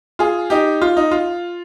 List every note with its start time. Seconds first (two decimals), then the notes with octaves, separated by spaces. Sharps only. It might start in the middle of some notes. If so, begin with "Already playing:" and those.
0.19 F4 G#4
0.50 D#4 G4
0.82 F4
0.97 D#4
1.11 F4